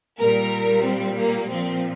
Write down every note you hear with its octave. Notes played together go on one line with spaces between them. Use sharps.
A#2 G3 A#4
C4
A#3
A#2 F3 C4